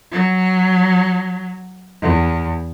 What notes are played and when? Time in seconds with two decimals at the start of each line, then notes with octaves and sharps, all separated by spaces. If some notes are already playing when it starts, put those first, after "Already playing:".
0.12 F#3
2.02 E2